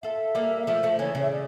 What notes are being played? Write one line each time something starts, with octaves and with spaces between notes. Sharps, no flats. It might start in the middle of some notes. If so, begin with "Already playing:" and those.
F4 A4 E5
G3 A#3
F5
F3 A3 E5
F3 A3
C#3 E3 C#5
C#3
E5
D5